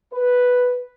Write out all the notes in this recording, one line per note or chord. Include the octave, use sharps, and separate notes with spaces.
B4